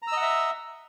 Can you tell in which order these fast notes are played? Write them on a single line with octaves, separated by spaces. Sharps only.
A#5 E6 D#5 F#5 E5